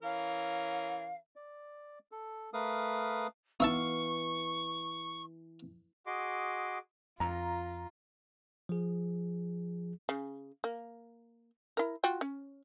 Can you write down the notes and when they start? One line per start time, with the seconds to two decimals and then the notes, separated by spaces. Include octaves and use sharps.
0.03 E3 C#4 A#4 F5
1.36 D5
2.12 A4
2.54 A3 A#4 B4 F5 D#6
3.60 E3 B3 D#4 E5 F5 A5 C#6
6.06 F#4 G#4 D#5 C6 D6
7.20 F2 F4 A#5
8.69 F3 G#4
10.09 C#3
10.64 A#3
11.77 E4 A#4
12.04 F4 F#4 G5
12.21 C#4